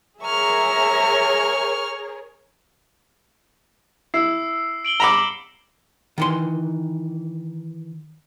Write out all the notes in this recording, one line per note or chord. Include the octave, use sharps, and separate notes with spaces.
G#4 A#4 C#5 E5 A#5 C#6 F6
E4 E6 C7
D7 F#7 G7
A#5 B5 D6 C#7 E7
D#3 E3 C6